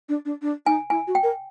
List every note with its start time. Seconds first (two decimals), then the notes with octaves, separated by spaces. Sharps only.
0.09 D4
0.25 D4
0.42 D4
0.66 D#4 G#5
0.90 E4 G#5
1.07 F#4
1.15 G5
1.23 A#4